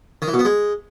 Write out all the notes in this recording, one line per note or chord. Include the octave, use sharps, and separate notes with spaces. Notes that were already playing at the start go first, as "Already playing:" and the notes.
D#3
E3
B2
B3
G#3